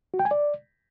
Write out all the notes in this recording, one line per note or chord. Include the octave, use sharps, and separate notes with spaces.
F#4
G5
G#5
D5